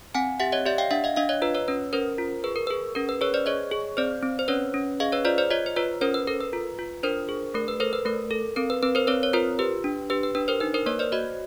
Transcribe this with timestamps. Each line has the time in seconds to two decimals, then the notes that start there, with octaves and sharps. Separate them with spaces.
0.15 C4 F#5 G#5
0.40 G4 E5 F#5
0.52 C#5 D#5
0.66 G4 D5 E5
0.78 F5 G5
0.91 D4 E5 F#5
1.04 D#5 F5
1.16 D4 D#5 F5
1.29 C#5 D#5
1.42 F4 B4
1.55 B4 C#5
1.68 C#4 B4
1.93 C#4 A#4 C5
2.18 F4
2.44 G#4 B4
2.56 A#4
2.67 G#4 B4
2.95 C#4 A#4
3.09 B4
3.21 G#4 B4 C#5
3.34 C5 D5
3.46 G#4 C#5 D#5
3.71 G#4
3.97 C4 C5 D5
4.23 C4
4.39 C5
4.48 C#4 B4 C#5
4.74 C#4
5.00 G#4 D#5 F5
5.12 B4 C#5
5.25 F4 C5 D5
5.38 C5 D5
5.50 F4 C#5 D#5
5.66 C5
5.76 F4 B4 C#5
6.01 C#4 A#4 C5
6.14 B4
6.27 A4 A#4
6.40 B4
6.53 F4
6.79 F4
7.03 D4 A#4 C5
7.29 G#4
7.54 A3 A#4
7.68 B4
7.80 A4 A#4 C5
7.93 B4
8.05 A3 A#4
8.31 A4
8.56 C4 A#4
8.70 B4
8.83 C4 B4
8.95 A#4 C5
9.07 C4 B4 C#5
9.23 C#5
9.33 F4 A#4 C5
9.59 G4 B4
9.84 D4
10.10 G4 B4
10.23 B4
10.35 D4 B4
10.48 A#4 C5
10.60 D#4 B4
10.74 A#4 C5
10.86 A#3 B4 C#5
10.99 C5 D5
11.12 F#4 C#5 D#5